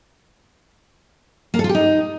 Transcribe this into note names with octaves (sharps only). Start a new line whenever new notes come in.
A#3
A4
F4
G4
D#4